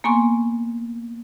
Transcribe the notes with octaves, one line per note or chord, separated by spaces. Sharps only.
A#3 B3 G#5 C6 C#6